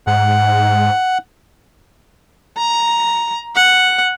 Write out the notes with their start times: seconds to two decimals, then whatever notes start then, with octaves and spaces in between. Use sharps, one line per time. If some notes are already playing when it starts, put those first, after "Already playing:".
0.07 G#2 F#5
2.57 A#5
3.55 F#5